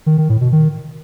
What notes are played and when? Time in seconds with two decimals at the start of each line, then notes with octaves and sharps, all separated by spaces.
0.06 D#3
0.18 D#3
0.29 A2
0.41 B2
0.52 D#3